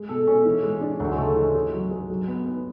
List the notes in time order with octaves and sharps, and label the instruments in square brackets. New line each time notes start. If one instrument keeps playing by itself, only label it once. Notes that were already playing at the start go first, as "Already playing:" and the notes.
Already playing: [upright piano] G#3
[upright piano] B2 [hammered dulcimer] A4
[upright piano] B2 [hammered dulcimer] C#4
[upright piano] E3
G#3
D4
[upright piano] D2 [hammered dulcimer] F#3
[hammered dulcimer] G#3
[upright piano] C#3 [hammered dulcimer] A3
[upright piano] E3 [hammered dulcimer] G#3
[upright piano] G#4
F#3
G#4
F#3
B3
B3